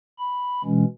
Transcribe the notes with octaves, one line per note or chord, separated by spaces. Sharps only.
B5
B2 E3 G#3 C#4